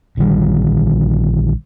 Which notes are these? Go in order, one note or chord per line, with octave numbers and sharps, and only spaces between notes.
A#1 D3 D#3 G3